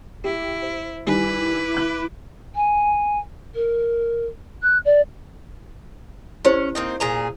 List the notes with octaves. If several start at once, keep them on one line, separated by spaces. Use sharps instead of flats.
E4 G4
C5
D#3 G3 E4 B4 G#5 D6
B5 F#6
G#5
A#4
F#6
D5
C#4 E4 G4 C5
A#3 C4 D#4
A#2 G#4 A#5